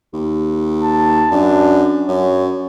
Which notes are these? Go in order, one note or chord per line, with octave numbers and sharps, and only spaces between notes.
D#2
A5
F#2 D4
F#2 C#5